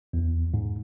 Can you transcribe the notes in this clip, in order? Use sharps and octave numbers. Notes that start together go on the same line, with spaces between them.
E2
G#2